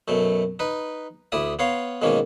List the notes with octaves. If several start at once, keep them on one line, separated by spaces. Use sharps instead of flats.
F#2 B2 A3
D#4 B4
D2 E4 D5 E5 D#6
B3 C#5 F5 C6
G#2 B2 D#3 A#3 C#4